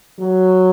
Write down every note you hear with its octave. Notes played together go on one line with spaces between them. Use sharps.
F#3